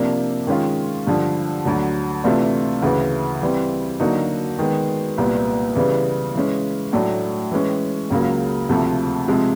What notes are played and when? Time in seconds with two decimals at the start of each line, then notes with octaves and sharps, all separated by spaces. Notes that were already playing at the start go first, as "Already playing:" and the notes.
Already playing: C3 F3 A#3 D4
0.47 D#3 G#3 C#4 F4
1.07 G2 D3 F3
1.65 D2 D3 F#3
2.24 C3 E3 A3 D4 F4
2.82 D2 C#3 E3
3.42 E3 G3 C4
4.00 D3 F#3 A#3 D#4 F#4
4.59 D#3 G#3 B3
5.18 C2 A#2 G3 B3
5.75 C#3 E3 G3 B3
6.35 E3 G#3 C#4
6.93 A2 F#3 A3 D4
7.51 E3 G#3 C#4
8.10 C#2 C#3 F#3 A#3
8.69 D2 C3 F3 A3
9.28 C3 F3 G#3